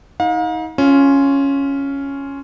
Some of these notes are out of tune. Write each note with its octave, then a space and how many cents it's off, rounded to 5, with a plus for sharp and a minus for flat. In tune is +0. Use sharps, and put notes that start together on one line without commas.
D#4 +35 F5 +40
C#4 +0 F4 +0